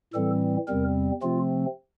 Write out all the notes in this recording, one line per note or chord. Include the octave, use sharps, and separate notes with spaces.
A2 E3 G3 C4 A4
E2 C3 G3 C4 A#4
C3 F3 A3 C4 F4